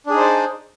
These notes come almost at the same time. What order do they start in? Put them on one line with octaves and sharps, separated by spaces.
D4 G#4 D#4 C5 D5